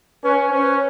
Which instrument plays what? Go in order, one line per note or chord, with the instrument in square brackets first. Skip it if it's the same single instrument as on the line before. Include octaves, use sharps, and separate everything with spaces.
[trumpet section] C#4 [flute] B4
[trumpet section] C#4 [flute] C5
[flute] B4